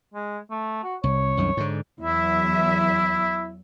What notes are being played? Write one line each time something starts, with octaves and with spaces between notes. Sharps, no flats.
G#3
A3
F#4
C2 C#5
C2 F#2 D#3
G#2 D3
E2 F#3 E4 E5